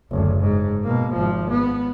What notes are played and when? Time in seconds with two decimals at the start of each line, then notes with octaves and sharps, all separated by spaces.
0.10 F#1 D2
0.40 G#2
0.84 B2 A#3
1.13 G#1 F3
1.50 B3